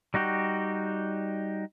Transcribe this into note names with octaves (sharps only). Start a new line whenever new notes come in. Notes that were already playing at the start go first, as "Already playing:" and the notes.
G3 D#4 F#4 G4